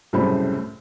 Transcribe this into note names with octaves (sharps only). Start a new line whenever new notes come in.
C2 F#2 A2 C#3 C5 B5